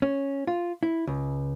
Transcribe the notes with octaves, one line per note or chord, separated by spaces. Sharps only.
C#4
F4
E4
C#2